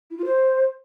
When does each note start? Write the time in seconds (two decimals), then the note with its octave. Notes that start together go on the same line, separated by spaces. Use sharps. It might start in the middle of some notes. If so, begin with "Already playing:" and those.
0.10 E4
0.17 F4
0.24 C5